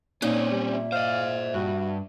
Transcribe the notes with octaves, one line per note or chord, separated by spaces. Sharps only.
A#2 C4 C#4 D#4 C#5
G3
E5
C5 D#5 F5
G2 F#4